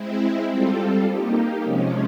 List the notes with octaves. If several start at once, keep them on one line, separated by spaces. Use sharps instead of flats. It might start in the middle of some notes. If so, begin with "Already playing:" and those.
Already playing: G#3 C4 E4
G3 C4 F4 A4
A#3 D#4 G4
C3 F3 G#3 C#4